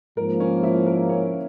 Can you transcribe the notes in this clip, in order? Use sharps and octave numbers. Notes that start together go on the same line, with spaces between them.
G#2 F3 A#3 A#4
C#4 C#5
E4 E5
A#4
C#4 C#5